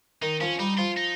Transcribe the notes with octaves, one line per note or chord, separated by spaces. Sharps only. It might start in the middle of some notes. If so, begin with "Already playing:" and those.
D#3 D#4
F3 C#4
G3 D#4
F3 F4
D#4